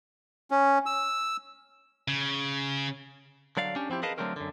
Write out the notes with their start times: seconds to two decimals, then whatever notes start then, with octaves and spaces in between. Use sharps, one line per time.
0.51 C#4
0.86 E6
2.08 C#3
3.57 D3 F#3 D5 F5
3.76 C#4 D4 G4
3.90 F3 C4 E4 G4
4.03 G#4 A#4 B4 D#5 F5 A5
4.18 D3 F#3 A3 C4 C#4 A#4
4.36 F#2 D3